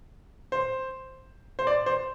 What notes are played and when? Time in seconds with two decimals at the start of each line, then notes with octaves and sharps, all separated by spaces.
0.52 C5
1.59 C5
1.67 D5
1.86 C5